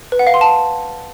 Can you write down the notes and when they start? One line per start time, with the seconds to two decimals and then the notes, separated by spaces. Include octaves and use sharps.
0.12 B4
0.19 F#5
0.27 F5
0.34 C6
0.41 A5